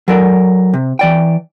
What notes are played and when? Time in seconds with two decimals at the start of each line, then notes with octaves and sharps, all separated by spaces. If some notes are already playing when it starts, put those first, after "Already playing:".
0.08 F#3 A4 A#4 D5
0.74 C3
0.99 E3 D5 G5